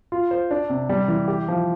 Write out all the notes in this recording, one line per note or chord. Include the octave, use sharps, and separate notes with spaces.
F4
C5
D4
C3
G3
E3
G4
F3